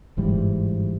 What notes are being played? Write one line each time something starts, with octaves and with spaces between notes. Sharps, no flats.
G1 G#2 E3 G3